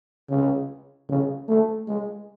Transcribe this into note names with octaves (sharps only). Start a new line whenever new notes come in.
C#3
C#3
A3
G#3